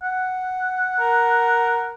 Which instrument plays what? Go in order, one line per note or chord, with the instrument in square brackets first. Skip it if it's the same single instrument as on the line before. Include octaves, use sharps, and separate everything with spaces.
[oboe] F#5
[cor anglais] A#4